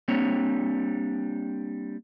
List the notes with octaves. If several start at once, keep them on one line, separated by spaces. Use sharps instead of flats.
G3 A#3 C4 D4 C#5